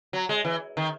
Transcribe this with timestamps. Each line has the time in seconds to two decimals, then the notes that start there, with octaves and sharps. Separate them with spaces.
0.13 F#3
0.29 G#3
0.45 E3
0.77 D#3